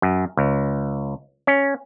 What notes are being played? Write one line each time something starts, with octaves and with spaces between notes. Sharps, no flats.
F#2
C#2
C#4